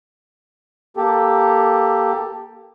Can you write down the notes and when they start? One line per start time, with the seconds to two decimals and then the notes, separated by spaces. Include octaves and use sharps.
0.97 A#3 G4 A4